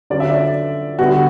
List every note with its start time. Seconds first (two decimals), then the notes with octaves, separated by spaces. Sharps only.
0.10 D3 F#3 C#4 D5
0.20 E5
0.30 D5
0.99 D3 G3 B3 F#4